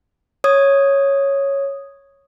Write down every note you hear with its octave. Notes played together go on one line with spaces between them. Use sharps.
C#5 D#6 G#6